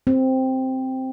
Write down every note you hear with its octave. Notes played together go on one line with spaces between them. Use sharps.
C4